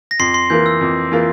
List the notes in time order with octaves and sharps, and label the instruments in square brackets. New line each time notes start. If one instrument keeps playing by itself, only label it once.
[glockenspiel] A#6
[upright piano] F2 [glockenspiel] C6 C7
[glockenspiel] C6 C7
[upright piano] E3 A#3 F4 A#4 [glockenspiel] G6
[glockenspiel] E6
[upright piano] F2
E3 A#3 F4 A#4